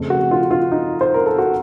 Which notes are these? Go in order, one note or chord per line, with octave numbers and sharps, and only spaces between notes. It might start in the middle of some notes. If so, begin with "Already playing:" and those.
Already playing: F2 C#3 A3
F#4
F4
F4
D#4
C5
A#4
A4
F#4